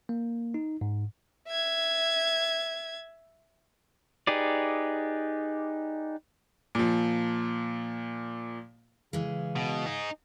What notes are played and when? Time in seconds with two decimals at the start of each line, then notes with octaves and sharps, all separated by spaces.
0.09 A#3
0.54 D#4
0.81 G#2
1.48 E5 G#6
4.27 D#4 G4 G#4 B4 D5
6.75 A#2 F3
9.13 C#3 E3 G#3
9.56 B2
9.86 D#4 G#4